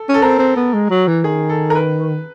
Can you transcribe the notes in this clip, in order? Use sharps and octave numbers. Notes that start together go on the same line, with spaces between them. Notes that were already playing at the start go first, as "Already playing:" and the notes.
Already playing: A4
C#4
A4
C4 A#4
C4
B3
G#3
F#3
E3
D#3 G#4
A4
A#4
B4